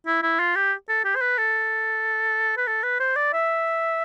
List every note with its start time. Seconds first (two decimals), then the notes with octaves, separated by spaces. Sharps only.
0.07 E4
0.23 E4
0.40 F4
0.56 G4
0.89 A4
1.05 G4
1.16 C5
1.21 B4
1.38 A4
2.57 B4
2.67 A4
2.83 B4
3.00 C5
3.16 D5
3.33 E5